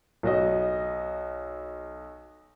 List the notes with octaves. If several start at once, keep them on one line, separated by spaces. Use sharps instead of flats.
B1 F#4 D#5